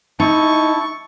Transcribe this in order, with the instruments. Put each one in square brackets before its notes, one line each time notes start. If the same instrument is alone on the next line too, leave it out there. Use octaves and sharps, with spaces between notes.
[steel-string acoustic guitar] D#4 [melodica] E4 A5 [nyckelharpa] C#6